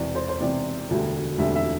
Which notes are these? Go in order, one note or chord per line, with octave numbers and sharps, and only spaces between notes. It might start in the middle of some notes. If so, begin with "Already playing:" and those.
Already playing: E1 E2 C3 D5
C5
C5
E1 E2 C3 D5
E1 D2 D3 G3
E1 D2 D3 G3 E5
E5